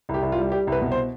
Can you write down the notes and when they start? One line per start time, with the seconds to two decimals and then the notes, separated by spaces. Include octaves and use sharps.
0.09 C2
0.14 G4
0.23 C2
0.32 F4
0.38 G3
0.52 G3 G4
0.67 C2
0.72 B4
0.82 B2
0.92 C5